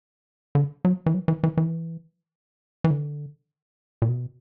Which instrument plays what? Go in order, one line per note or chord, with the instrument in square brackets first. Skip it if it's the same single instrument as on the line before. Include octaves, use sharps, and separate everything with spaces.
[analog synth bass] D3
F#3
E3
F#3
E3
E3
E3
E3
D3
A#2
B2